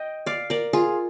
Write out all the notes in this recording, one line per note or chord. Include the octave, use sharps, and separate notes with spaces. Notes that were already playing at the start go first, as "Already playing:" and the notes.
Already playing: D#5 G5
D5 F5
A#4 D5
F4 G#4